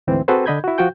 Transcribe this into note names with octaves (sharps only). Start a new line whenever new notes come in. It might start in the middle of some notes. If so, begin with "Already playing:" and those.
D2 G#2 E3 C4
C4 F#4 G#4 A4 B4 C5
D3 D4 D#5 B5 G6 G#6
E4 F#4
F3 F4 F#4 G5 G6